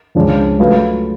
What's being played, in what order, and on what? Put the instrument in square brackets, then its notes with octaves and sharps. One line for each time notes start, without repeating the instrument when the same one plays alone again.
[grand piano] C#2 C#3 F3 G#3 D4
F#3 A3 F4 B4 F5